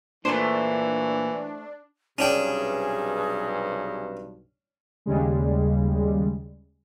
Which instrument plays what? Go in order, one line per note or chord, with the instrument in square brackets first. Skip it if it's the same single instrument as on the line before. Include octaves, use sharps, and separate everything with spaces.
[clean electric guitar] A#2 [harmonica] E3 [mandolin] A3 C5 [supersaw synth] D4
[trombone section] B1 G2 C3 [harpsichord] C#4 D4 G5 [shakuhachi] G#4
[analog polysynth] D#2 C#3 G3 G#3